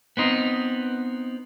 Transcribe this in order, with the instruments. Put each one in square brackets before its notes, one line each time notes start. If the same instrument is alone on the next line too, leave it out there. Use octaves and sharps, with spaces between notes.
[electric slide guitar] B3 C4 D#4